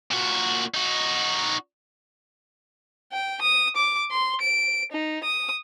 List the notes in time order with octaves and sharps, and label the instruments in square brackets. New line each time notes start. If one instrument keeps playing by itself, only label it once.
[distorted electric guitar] A#2 F#4
D#4 F#4
[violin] G5
D#6
D6
C6
D7
D#4
D#6